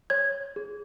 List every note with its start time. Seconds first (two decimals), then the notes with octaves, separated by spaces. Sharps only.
0.10 C#5 G#6
0.56 G#4